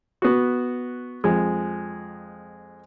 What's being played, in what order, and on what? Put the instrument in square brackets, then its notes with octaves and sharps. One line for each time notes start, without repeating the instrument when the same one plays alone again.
[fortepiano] B3 F#4
F2 G#3